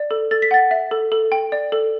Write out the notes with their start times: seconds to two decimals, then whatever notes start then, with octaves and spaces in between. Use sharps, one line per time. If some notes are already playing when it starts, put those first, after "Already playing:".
Already playing: D5
0.11 A4
0.31 A4 A6
0.42 B6
0.51 F#5 A6
0.71 E5
0.91 A4
1.12 A4
1.32 G5
1.52 D5
1.72 A4